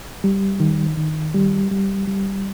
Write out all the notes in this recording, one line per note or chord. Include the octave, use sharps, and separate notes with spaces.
G3
D#3
D#3
G3
G3
G3